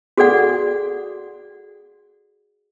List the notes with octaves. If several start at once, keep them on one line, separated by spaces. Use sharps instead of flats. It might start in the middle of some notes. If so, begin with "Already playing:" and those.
F#4 G#4 A4 D5 F#5